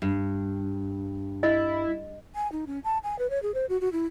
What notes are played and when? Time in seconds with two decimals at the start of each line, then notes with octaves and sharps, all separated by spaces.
0.02 G2
1.43 E4 D#5
2.35 G#5
2.52 D#4
2.67 C#4
2.84 A5
3.04 G#5
3.19 B4
3.30 C#5
3.43 G#4
3.54 C5
3.69 F#4
3.81 F#4
3.92 E4